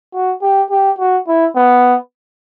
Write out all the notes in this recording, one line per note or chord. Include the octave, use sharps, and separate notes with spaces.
F#4
G4
G4
F#4
E4
B3